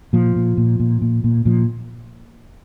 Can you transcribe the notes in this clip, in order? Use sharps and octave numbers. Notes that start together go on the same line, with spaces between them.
A#2 F3
A#2
A#2
A#2
A#2
A#2
A#2 F3